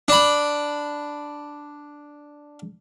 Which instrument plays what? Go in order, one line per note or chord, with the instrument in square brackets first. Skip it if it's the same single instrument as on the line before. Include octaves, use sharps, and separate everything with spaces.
[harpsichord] D4 B5